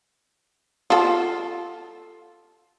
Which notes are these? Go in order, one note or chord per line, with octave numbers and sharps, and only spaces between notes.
F4 A4